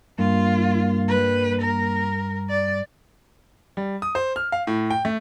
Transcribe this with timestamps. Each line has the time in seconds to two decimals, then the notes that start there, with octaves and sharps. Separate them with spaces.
0.19 G2 A#3 F4
1.08 G3 B4
1.61 A#4
2.50 D5
3.77 G3
4.02 D#6
4.15 C5
4.36 F6
4.52 F5
4.67 A2
4.90 G5
5.05 A3